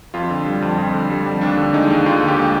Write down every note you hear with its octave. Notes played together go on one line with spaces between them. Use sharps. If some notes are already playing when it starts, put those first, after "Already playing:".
F2 F4
D3
G3
F2
F2
D3
G3
F2
D#2 D4
D3
G#3 D#4
D#2
D#2 F4
D3
G4
G#3